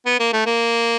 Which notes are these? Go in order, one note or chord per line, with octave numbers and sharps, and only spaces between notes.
B3
A#3
A3
A#3